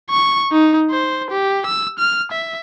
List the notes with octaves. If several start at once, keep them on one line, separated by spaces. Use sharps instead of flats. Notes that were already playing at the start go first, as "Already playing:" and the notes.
C#6
D#4
C5
G4
E6
F6
E5